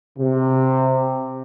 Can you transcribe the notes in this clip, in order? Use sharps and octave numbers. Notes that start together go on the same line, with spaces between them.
C3